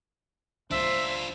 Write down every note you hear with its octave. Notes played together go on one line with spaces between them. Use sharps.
C#2 D4 F4 C5 E5